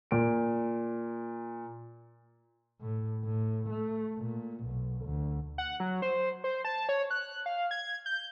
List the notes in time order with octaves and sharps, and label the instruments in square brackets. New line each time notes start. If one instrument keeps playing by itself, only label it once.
[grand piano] A#2 D7
[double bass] A2
A2
A3
A#2
B1
D2
[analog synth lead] F#5
F#3
C5
C5
A5
C#5
F#6
F5
G#6
G6